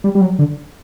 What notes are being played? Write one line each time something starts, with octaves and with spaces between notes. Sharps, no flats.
G3
G3
F#3
D3